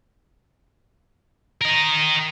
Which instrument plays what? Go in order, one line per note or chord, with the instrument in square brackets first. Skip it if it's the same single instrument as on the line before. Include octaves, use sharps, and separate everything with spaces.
[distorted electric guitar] A#4 D#5